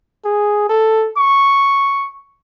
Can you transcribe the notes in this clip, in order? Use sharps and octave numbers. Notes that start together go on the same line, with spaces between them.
G#4
A4
C#6